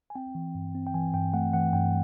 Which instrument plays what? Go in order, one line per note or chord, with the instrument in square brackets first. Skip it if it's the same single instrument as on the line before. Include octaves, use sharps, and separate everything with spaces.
[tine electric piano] G#5
C4 G5
E3
G2
C4
G5
E3 G#5
G2 G5
A3 F#5
E3 F#5
G2 G5